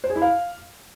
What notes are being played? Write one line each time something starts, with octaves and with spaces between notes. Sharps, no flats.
C5
G#4
E4
F5